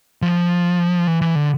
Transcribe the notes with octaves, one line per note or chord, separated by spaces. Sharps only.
F3
E3
E3
D3